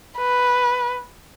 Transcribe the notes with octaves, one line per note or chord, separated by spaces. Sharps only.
B4